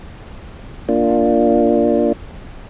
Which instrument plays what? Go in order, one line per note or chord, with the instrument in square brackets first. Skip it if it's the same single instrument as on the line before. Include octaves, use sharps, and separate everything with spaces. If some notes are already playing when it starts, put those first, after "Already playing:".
[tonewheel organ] A#3 D4 F4